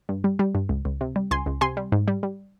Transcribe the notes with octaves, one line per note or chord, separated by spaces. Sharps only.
G2
G3
G3
G2
C#2
C#2
C3
G3
C#2 G#5 C6
C#2
C3 G#5 C6
G3
G#2
G3
G3